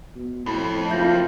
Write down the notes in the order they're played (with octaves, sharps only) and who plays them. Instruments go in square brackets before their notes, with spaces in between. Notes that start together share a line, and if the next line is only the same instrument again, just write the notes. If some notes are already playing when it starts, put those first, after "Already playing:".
[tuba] B2
[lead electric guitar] F2 [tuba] A2 [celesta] B5
[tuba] F#1 [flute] F4 [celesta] E5 G6 A#6